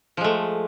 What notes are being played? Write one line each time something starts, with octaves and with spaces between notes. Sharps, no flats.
F3 G#3 A3